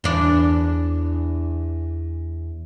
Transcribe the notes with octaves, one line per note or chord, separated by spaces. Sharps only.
E2 D4